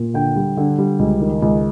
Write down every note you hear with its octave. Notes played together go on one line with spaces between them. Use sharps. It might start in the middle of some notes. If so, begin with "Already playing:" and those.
Already playing: A#2
D3 G5
G3
D3
G3
C#2
D#3
C#2